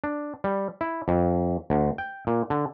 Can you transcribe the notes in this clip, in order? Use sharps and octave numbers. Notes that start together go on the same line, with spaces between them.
D4
G3
E4
F2
D2
G5
A#2
D3